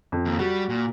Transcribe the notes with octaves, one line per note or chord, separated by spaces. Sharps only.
F2
D#2
G3 F#4
A#2